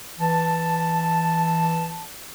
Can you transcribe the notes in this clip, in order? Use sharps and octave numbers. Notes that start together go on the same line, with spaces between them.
E3 A5